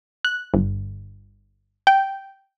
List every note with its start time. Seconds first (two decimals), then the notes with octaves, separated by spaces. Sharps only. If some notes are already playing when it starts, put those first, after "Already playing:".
0.25 F#6
0.54 G1
1.87 G5